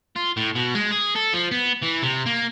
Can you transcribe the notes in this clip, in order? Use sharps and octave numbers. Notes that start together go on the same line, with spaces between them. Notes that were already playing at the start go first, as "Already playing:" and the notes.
F4
A2
B2
G#3
G#4
A4
F3
B3
E3
C3
A#3